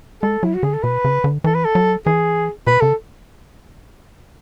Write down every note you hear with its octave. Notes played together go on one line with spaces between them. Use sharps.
G#3 A4
F#3 E4
F#4
D3 G#4
A4
B2 B4
C#3
D3
E3 A4
B4
A4
F#3
E3 G#4
B2 B4
C#3 A4